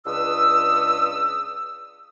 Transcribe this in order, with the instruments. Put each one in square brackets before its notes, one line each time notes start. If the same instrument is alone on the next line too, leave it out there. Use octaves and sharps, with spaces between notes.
[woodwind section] C#2 D4 B4 D#6 E6